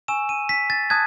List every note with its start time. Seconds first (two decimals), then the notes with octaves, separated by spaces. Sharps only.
0.08 G#5 C#6 E6 E7
0.29 D#7
0.49 B6
0.70 A6
0.90 A5 D#6 F#6 G#6